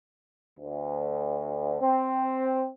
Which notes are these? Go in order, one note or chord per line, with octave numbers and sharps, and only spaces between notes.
D2
C4